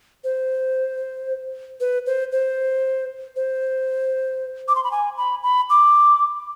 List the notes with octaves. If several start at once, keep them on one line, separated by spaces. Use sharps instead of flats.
C5
B4
C5
C5
C5
D6
C6
B5
G#5
B5
B5
D6